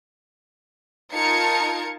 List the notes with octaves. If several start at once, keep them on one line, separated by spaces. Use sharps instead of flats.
D#4 F4 A#4 A5 G#6 C#7